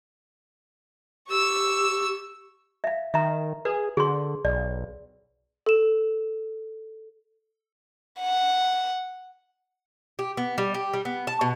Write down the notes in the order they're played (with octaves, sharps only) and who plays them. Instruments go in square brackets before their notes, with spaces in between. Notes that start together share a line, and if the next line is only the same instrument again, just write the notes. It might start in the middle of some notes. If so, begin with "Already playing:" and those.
[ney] G4 [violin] C#6 E6
[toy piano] E5 F5
[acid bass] D#3 [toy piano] E5 A#5
[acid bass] G#4 [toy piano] B4
[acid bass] D3 [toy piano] G#4 C6
[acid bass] B1 [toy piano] D5
[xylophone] A4 E7
[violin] F#5
[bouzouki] G4
B3
G3
G4
G3
B3
A5
B2